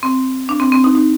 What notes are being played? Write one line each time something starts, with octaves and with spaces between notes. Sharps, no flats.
C4
D4
C4
C4
D#4
D#4